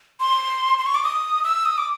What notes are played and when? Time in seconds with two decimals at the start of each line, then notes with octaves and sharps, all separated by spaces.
0.20 C6
0.79 C6
0.86 C#6
0.95 D6
1.03 D#6
1.44 E6
1.65 D#6
1.78 D6